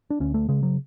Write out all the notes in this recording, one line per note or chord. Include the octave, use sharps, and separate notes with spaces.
D4
D2 C#4
A3
C#3 G#3
F#3